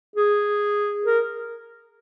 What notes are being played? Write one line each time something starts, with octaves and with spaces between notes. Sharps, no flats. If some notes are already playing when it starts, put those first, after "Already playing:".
G#4
A#4